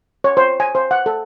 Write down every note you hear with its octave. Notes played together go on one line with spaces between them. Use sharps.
C#5
C5
G#5
C5
F#5
A4